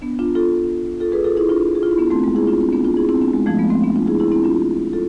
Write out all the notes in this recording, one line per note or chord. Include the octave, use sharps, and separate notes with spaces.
B3 D4
D4 F4
F4 A4
F4 A4
G#4 B4
F4 A4
E4 G#4
D4 F4
G#4
F4
E4
B3 D4
A3 C4
G#3 B3
E4 G#4
D4 F4
C4 E4
B3 D4
D4 F4
E4 G#4
C4 E4
B3 D4
G#3
F3 A3
G#3 B3
A3 C4
B3 D4
D4 F4
E4 G#4
E4 G#4
C4 E4
D4 F4
F4 A4